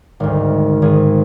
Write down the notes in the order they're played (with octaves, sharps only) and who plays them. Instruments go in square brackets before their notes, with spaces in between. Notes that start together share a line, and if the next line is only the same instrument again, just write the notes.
[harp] G#1 D2
G#1 G#4